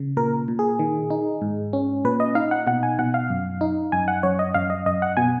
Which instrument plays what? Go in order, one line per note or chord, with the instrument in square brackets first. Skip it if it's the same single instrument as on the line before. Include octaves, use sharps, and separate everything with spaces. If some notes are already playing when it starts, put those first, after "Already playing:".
Already playing: [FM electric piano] C#3
A#2 A#4
A#2
G#4
D#3
D#4
G#2
C#4
A#2 B4
D#5
D#4 F5
F#5
B2 F#5
G#5
B2 F#5
F5
F#2
D#4
F#2 G#5
F#5
F#2 C#5
D#5
F#2 F5
D#5
F#2 D#5
F#5
B2 G#5